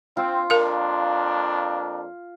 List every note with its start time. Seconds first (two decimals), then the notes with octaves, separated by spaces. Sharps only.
0.17 C4 F4
0.50 F2 A#3 D4 A#4 F5